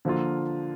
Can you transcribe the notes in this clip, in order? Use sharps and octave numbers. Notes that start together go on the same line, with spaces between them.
D3 F3 A#3 F4